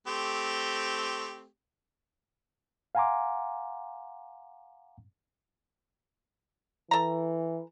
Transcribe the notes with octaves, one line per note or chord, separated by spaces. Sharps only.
A3 C4 G4
F5 F#5 G#5 A#5 C6 D6
E3 A4 A#5